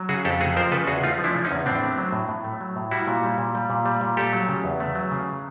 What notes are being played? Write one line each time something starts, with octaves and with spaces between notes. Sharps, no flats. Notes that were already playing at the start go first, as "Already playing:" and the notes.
Already playing: F#3
C#3 F#4 G#4
F2 G4 A4
A3 F#4 G#4
F3 A#4 C5
C#3 A4 B4
E2 F#4 G#4
A3 D#4 F4
F3
D4 E4
C#3
C#4 D#4
E2
A2 C4 D4
A3
F#3
A2
A2
A3
F#3
A2
G3 E4 F#4
A#2
G3
A#2
G3
A#2
G3
A#2
A3 G4 A4
F#3
C#3
E2
A3
F#3
C#3